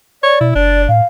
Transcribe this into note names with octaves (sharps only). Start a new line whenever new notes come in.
C#5 D5
B2 E4
F#1 D4 D5
A2 F5